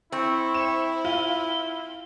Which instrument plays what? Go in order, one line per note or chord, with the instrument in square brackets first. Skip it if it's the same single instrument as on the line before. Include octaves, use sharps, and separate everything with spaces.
[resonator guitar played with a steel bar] C4 [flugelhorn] E4 [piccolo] C#6
[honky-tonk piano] E7
[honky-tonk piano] F4 [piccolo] G7